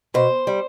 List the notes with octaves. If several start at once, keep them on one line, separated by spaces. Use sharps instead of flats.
B2 C5
G3